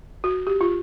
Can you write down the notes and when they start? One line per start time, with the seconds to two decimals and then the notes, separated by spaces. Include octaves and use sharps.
0.24 F#4
0.47 G4
0.61 F4